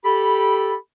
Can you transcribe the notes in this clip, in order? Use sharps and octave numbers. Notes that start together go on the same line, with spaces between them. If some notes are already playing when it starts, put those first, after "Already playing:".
G4 A4 B5